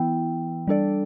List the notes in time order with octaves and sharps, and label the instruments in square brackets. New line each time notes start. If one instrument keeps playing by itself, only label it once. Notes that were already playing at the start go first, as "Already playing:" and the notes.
Already playing: [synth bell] E3 B3 E4 [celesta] G5
[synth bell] G3 D4 A4 D5